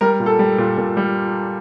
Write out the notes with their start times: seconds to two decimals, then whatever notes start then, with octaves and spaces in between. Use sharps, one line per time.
0.01 G3 A#4
0.20 A#2
0.26 A4
0.39 G3
0.58 A#2
0.78 A#2
0.97 G3